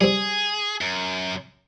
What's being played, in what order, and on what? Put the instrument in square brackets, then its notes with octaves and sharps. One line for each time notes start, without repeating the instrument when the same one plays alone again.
[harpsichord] G3 C4 [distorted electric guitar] G#4
[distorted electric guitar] F#2